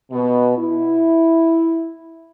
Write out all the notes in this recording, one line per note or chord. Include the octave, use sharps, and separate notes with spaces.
B2
E4